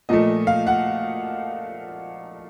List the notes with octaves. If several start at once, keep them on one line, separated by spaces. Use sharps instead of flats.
A#2 F3 A3 D#5
F5
F#5